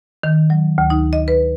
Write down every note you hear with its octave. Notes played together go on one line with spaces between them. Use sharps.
D#3
F#3
D2
D#4
D#5
B4